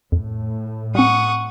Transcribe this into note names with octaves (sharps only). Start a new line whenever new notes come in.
F2 A2
G3 C4 F#5 C#6 D#6